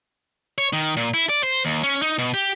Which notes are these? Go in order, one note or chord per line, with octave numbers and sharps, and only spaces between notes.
C#5
D#3
A#2
E4
D5
C5
D#2
C#4
D#4
B2
G4